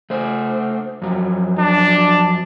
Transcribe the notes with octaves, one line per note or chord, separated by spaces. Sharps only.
A3 C5
F2 F#3
D4